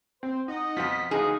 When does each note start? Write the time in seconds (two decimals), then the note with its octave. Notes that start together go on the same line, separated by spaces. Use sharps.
0.23 C4 C5
0.48 D#4 D#5 F#5
0.77 F2 B2 F3 B6
1.11 D2 E3 D#4 G#4 F5 D#6